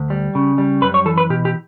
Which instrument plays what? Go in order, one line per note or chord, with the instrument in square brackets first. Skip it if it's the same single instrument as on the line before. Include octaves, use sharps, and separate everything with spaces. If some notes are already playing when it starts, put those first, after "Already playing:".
Already playing: [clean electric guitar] D2
G3
C#3
G3
F#2 B4
C#5
E3 A4
B4
B2 G4
G4